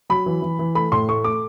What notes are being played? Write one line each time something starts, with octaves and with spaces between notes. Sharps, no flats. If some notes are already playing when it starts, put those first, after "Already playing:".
F#3 B5
E3
E3
E3
A3 B5
A2 C6
A3 C#6
A3 D6